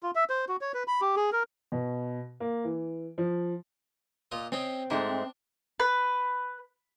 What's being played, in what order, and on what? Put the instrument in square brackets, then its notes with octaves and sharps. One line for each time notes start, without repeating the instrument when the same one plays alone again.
[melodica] F4
E5
C5
F#4
C#5
B4
B5
G4
G#4
A#4
[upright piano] B2
A#3
E3
F3
[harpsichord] A#2 F4 D#5
[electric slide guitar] C4 [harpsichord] C#4 D#5 G5
[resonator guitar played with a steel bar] G#2 G#3 A3 [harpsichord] D4
[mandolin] B4